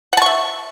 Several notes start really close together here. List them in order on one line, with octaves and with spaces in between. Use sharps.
F#5 A5 C#6 E5